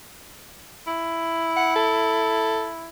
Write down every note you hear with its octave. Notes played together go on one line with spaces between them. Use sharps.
E4
F#5
A4